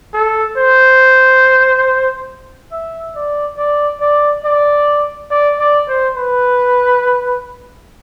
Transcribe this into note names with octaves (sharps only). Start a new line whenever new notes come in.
A4
C5
E5
D5
D5
D5
D5
D5
D5
C5
B4